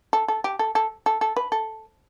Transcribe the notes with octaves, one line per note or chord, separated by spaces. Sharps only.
A4
A4
G4
A4
A4
A4
A4
B4
A4